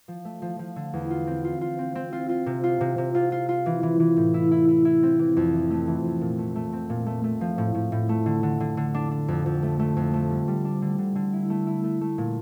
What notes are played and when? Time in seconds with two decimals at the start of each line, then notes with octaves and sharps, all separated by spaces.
0.08 F3
0.25 A3
0.42 F3
0.59 F3
0.76 D3
0.94 E2
1.10 F4
1.27 C4
1.45 F4
1.61 F4
1.79 C4
1.95 C4
2.13 F4
2.29 F4
2.46 C3
2.64 F4
2.81 C3
2.98 C3
3.15 F4
3.32 F4
3.49 F4
3.66 E3
3.83 E3
4.00 E3
4.17 A2
4.34 E4
4.51 E4
4.68 E4
4.85 E4
5.03 C4
5.19 E3
5.37 F2
5.53 E3
5.70 A3
5.88 E3
6.05 F2
6.21 A#2
6.39 A3
6.56 A3
6.73 C4
6.90 A#2
7.06 A3
7.24 A3
7.41 F3
7.58 A2
7.75 A2
7.92 A2
8.09 A3
8.26 D3
8.43 D3
8.60 D3
8.77 D3
8.94 D4
9.11 D4
9.28 F2
9.46 F2
9.63 A3
9.79 A3
9.97 F2
10.14 A3
10.31 G3
10.48 G3
10.65 D4
10.82 D3
10.99 D3
11.15 D3
11.33 E4
11.50 A3
11.67 E4
11.84 A3
12.01 A3
12.18 A#2